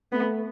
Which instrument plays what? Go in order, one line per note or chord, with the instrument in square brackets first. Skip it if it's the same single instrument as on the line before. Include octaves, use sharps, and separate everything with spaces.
[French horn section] A3 [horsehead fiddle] B3